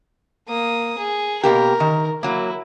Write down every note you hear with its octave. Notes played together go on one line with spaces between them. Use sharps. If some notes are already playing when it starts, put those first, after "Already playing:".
A#3 D#6
G#4
B2 A#3 G4 A#4
D#3
F#3 A#3 E4